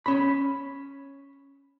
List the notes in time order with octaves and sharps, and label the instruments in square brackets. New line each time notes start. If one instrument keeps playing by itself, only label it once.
[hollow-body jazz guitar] C#4 B5